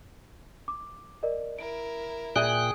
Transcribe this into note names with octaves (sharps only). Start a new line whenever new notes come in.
D6
A#4 D5 D#5
E4 A#4 D7
A#2 G#4 D5 E5 G5 F#6 D#7